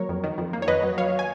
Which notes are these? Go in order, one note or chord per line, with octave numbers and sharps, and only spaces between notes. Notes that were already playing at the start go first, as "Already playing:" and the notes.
Already playing: F#3 A#3 A#4 C#5
F2
D#3
F2
A#3
C#5
F2 B4 D#5
F#3
F#3 C#5 F5
G#5